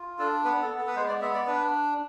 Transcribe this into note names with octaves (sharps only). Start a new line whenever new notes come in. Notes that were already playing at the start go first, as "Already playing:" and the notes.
Already playing: F4
D4 A4
B3 B4
A4
B3
A4
B4
G#3 C5
D5
B3 E5
D5
D4 B4